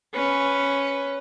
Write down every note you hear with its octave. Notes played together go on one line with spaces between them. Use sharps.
C#4 B4